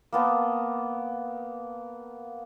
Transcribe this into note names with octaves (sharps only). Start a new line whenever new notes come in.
A#3 B3 A5